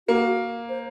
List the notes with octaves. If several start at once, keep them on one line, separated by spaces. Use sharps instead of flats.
A#3 F#4
C5